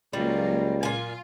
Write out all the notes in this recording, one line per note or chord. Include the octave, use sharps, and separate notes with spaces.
C#2 F#3 G3 A#3 F4
A#2 F4 G#5